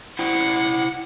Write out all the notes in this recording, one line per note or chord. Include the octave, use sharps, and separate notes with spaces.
E4 C5 F#5 G5